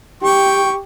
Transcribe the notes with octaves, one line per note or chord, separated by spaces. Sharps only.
G4 G5 C#6